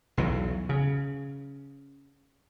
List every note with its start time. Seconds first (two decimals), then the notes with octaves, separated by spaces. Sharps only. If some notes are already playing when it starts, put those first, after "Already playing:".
0.17 B1 E2 E3 F#3
0.69 C#3